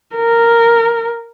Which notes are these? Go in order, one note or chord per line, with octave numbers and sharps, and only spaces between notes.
A#4